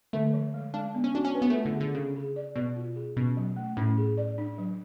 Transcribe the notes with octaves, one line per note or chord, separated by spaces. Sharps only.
D3 A3
F3
G#3
G#3 D4
B3
C#4
D4 F#4
C#4
B4
B3
A3
F4
D3
G#4
D3
C#3 C#4
G#4
D5
B2 D5
F4
G#4
B2 C#4
F#3
A3
A2 C#4
G#4
D5
D4
F#3